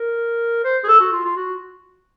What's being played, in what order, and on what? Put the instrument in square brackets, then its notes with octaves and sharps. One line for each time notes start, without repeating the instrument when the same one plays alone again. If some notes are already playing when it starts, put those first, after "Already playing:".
Already playing: [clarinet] A#4
C5
G#4
A4
F#4
F4
F4
F#4